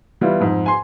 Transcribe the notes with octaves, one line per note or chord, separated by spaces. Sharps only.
E3 G3 B3 E4 F4
F2 G#2
G#5 C6